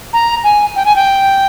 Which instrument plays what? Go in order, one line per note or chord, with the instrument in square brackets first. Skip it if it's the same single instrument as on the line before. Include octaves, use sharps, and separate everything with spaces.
[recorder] A#5
G#5
G5
G#5
G5